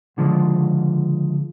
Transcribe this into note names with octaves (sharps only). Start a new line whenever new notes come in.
C#2 D3 F3 G#3